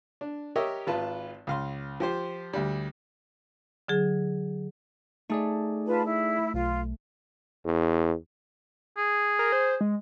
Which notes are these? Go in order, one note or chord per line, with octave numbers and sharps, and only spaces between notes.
D4
G4 A#4 C#5 D#5 E5
G#1 F4 B4 A5
C#2 F5 C6
F3 G4 C5
D2 G3
D3 F#3 G#4
A3 D#4 G#4 D5
F4 B4 A5
E4
B1 F4
E2
G#4
A#4
C5
G#3